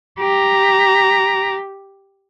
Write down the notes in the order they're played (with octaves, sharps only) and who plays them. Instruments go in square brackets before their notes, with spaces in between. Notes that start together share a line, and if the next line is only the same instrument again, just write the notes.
[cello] G4 [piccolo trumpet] A#5